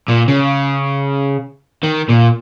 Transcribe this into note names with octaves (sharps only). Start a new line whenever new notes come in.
A#2
C#3
D#3
A#2